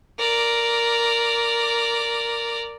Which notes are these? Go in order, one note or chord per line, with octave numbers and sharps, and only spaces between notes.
A#4 D5